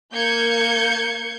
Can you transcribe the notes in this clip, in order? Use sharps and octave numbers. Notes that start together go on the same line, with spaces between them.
A#3 G6 G#6 C#7